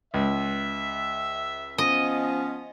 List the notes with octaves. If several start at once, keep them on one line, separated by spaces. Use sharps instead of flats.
C#2 E5
F3 B3 C#4 D#5